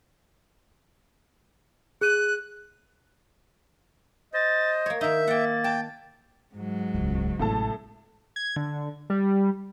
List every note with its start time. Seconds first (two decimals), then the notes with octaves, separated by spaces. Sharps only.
2.01 G#4 F#6 D#7
4.34 C5 D#5 A6
4.86 A#3 C#5 G#6
5.01 D#3 D#4 E5 G6
5.27 A#3 F#5 G5 A6
5.64 G5 A5
6.55 G#2 F#3
6.94 D#1 C#2
7.39 A1 A2 C3 A4 A5
8.36 G#6
8.56 D3
9.10 G3